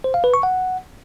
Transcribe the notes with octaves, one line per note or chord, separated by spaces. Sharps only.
C5
F5
B4
C#6
F#5